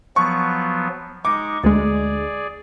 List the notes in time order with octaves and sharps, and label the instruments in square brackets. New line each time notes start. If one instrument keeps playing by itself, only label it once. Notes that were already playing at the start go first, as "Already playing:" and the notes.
[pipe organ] F3 F#3 B3 [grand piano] C#6
[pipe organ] G#3 D#4 C#6 [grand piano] D6
[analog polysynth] D2 G#3 [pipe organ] G#4 D5